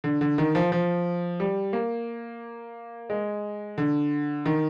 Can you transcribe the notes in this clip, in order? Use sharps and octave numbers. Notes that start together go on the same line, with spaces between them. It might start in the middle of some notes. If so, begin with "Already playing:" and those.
D3
D3
D#3
F3
F3
G3
A#3
G#3
D3
D#3